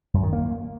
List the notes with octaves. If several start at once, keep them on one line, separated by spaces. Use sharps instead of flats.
F#2
D#3
A#3